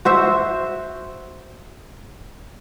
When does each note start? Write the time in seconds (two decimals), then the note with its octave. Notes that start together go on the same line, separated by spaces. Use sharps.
0.05 F#4 C5 E5